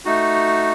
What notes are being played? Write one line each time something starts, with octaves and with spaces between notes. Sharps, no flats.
A3 D#4 F#4